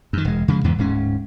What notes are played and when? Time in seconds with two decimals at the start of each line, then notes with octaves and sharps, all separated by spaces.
0.13 F#2 D#3
0.25 E1 G#3
0.48 C#3 F3 G3 G#3
0.64 E2 G#2 E3 B3
0.78 D1 G#2 C#4